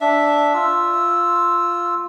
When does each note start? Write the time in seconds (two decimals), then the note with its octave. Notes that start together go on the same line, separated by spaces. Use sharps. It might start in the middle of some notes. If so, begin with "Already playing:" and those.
0.01 D4 E5
0.54 F4 E6